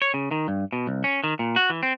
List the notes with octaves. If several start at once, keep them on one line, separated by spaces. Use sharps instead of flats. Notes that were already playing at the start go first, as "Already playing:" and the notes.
C#5
C#3
D#3
G2
B2
C2
C#4
D#3
A#2
F#4
E3
C4